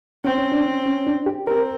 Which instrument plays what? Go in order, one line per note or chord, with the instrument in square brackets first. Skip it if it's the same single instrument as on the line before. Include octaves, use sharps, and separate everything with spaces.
[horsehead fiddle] C4 [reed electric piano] C#4
[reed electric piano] C#4
D4
C#4
C#4
D4
G4
[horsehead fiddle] C4 [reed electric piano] A#4